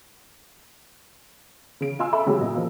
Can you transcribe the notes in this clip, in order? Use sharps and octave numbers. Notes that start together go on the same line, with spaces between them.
C#3 D7
F4 D#5 G#5 C6 E6
A4 E5 G#5 B5 D6
C#3 F#3 G#3 G4
A#2 F#4 D#5
F3 A#3